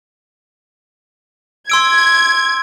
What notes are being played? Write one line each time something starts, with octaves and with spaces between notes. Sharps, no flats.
C6 E6 G#6 D7